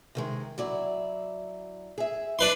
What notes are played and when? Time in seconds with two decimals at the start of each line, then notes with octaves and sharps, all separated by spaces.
0.15 C3 D#3 G#3
0.58 F#3 E4 D5
1.98 G#4 E5
2.39 D4 E4 G#4 B4 C6